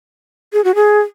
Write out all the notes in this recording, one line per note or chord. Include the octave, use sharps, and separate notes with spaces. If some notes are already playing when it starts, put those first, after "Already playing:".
G#4
F#4
G#4